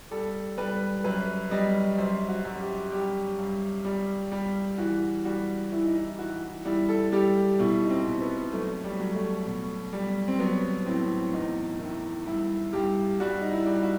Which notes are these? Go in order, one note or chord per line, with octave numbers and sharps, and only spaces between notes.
G3 A4
G3 B4
F#2 B4
G3 D#5
F#2 C5
F#4
F#2
G4
G3 G4
G2
G3
G3
E3 F#4
G3 F#4
E3 E4
D#4
E4
E3 F#4
G3 E4
A4
G3 G4
B2 E4
D#4
C4
B2
B3
F#3 A3
G3
F#3
A3
B2
G3
C4
F#3 B3
A2 C4
E2 D#4
D#3 E4
G2 E4
G2 G4
G3 F#4
D#4
E4
G3
F#4